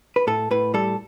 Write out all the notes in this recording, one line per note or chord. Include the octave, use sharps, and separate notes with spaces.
B4
A2 A4
A2 B4
G3 A4